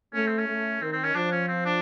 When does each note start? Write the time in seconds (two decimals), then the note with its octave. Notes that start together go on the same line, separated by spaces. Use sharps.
0.14 A3 C#4
0.27 C4
0.38 C#4
0.48 A3
0.82 D#3 C4
0.93 C4
1.04 C#4
1.15 F3 D4
1.32 C#4
1.48 C4
1.65 D4